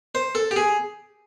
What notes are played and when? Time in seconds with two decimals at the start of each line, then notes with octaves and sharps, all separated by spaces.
0.15 C5
0.35 A4
0.51 G4
0.56 G#4